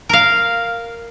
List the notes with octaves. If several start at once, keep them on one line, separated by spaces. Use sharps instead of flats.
A#4 F5